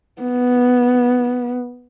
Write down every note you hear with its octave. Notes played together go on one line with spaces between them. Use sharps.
B3